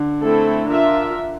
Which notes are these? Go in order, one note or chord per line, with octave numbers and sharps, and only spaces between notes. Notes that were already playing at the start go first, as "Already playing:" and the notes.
Already playing: D3
A3 C4 E4 A4
D4 F4 A#4 E5